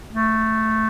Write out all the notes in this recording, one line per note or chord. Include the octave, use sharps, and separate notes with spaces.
A3